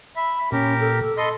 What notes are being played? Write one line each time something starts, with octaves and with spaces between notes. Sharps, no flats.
E5 B5
A#2 C#4 G4 A#4
A4
A4 D#5 B5 C6